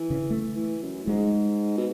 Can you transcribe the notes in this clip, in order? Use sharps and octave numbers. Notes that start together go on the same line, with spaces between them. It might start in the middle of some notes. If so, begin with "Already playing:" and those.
Already playing: E3
C#3
A3
E3
F#2
A2
G#2 G#3
B2